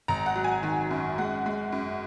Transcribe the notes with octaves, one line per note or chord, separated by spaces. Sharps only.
G#1 A#5
F#5
F#3
G#5
D#3
F#2
G#3 F#5
G#3
F#2